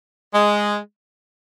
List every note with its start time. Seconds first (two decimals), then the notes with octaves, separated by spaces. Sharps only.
0.34 G#3